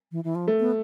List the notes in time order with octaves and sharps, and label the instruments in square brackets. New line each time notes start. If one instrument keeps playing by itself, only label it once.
[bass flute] E3
E3
F3
[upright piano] A3
[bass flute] B3